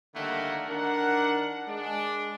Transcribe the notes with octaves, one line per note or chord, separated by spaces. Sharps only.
D3 D#3 G3 A3 A#3 F#5
D#3 D4 A#4 F#5
G#3 D4